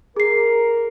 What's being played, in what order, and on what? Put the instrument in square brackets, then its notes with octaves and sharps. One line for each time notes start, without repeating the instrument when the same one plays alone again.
[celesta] G#4 C7 [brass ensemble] A#4